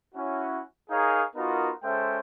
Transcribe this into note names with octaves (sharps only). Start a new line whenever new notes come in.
C#4 E4 F#4
D#4 G#4 A#4 C#5 F5 G#5
B3 D#4 F4 F#4 A#4
G#3 C#4 A4 C5 E5 G5